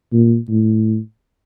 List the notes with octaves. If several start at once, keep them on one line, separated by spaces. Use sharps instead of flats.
A#2
A2